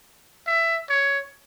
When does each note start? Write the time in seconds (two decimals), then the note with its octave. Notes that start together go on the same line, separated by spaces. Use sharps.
0.47 E5
0.89 C#5